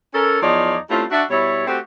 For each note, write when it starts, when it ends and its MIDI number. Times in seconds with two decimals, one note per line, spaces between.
0.14 0.41 61
0.14 0.41 69
0.14 0.41 70
0.41 0.76 40
0.41 0.76 53
0.41 0.76 63
0.41 0.76 73
0.41 0.76 74
0.89 1.04 55
0.89 1.04 57
0.89 1.04 60
0.89 1.04 61
0.89 1.04 64
0.89 1.04 65
1.11 1.23 62
1.11 1.23 66
1.11 1.23 76
1.30 1.63 47
1.30 1.63 55
1.30 1.63 64
1.30 1.63 73
1.67 1.79 57
1.67 1.79 60
1.67 1.79 66
1.67 1.79 67